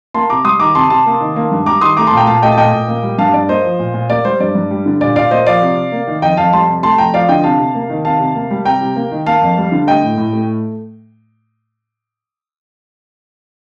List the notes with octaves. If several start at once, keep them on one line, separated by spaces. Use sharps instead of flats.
A#3 A5 C6
C3 A#5 D6
G3 C6 D#6
D#3 A#5 D6
C3 A5 C6
C3 A5 C6
A#3
D#3
A#3
G2
G3 A#5 D6
D#3 C6 D#6
A3 A#5 D6
A5 C6
A#2
G5 A#5
A#2 F5 A5
A3 D#5 G5
A5
A#2 D#5 G5
A#2
A#3
G3
G2 F5 A5
G2 D5
A#3 C5 D#5
F3
A#2
A#2
A#3 D5
G3 C5
G2 D5
G2
G3
D3
A#2 D5
A#2 D5 F5
A#3 C5 D#5
F3 D5 F5
C3
C3
A#3
D#3
F2 D#5 G5
F2 F5 A5
G3 A5 C6
C3
A3 A5 C6
F2 G5 A#5
F3 D5 F5
D3 D#5 G5
C3 F5 A5
C3
A#3
D#3
C3 F5 A5
C3
A#3
G3
C3 G5 A#5
C3
A#3
D#3
A#3 F5 A5
F2
G3
D3
A3 D#5 G5
A2
A2
A3